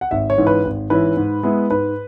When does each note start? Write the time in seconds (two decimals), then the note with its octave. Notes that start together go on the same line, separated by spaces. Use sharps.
0.01 F#5
0.11 G#1 E5
0.30 C#5
0.38 G#2 E3 C#4
0.47 B4
0.65 G#1
0.90 G#2 E3 C#4 B4
1.17 G#2
1.43 G#3 B3 E4
1.71 G#2 B4